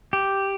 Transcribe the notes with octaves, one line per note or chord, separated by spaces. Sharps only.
G4